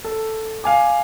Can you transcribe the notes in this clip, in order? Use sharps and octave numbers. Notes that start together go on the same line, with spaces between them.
A4
F5 G#5 D6